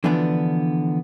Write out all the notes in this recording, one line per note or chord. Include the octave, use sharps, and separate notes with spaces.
D3 E3 F3 B3 D4